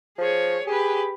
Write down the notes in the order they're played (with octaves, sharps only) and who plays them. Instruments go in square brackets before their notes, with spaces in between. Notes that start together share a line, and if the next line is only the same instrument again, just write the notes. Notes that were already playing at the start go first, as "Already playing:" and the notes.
[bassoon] F3 [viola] G#4 C#5
[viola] G4 B4 [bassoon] G#4